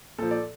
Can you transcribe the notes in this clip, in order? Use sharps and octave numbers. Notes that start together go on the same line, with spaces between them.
A#2 F3 A4
D5